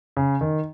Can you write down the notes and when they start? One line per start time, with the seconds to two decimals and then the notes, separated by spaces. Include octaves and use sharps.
0.17 C#3
0.41 D#3